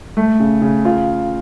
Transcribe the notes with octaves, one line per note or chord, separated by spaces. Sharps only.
A3
C#3
C#3
F4